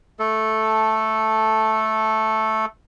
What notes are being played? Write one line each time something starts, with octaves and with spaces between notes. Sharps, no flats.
A3 A4